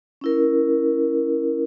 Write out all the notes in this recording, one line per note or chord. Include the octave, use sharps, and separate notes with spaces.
C#4 E4 A#4